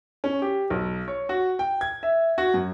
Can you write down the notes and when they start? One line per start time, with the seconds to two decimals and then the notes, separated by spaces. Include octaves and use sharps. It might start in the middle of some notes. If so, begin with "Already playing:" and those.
0.24 C#4
0.42 G4
0.70 B1
1.08 C#5
1.29 F#4
1.59 G5
1.81 G#6
2.03 E5
2.38 F#4
2.54 F#2